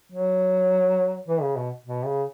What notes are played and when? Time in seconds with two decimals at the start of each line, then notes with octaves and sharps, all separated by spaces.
0.12 F#3
1.28 E3
1.42 C#3
1.57 B2
1.86 B2
2.06 C#3